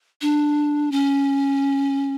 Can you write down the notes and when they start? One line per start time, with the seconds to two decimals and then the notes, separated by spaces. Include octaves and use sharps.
0.22 D4
0.92 C#4